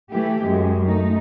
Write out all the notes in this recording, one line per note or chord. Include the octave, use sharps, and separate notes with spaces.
E3 A3 G4
F#2 G#3
A3 D#4